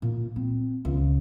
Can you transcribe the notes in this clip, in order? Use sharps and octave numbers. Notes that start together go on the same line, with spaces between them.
A#2
C4
C#2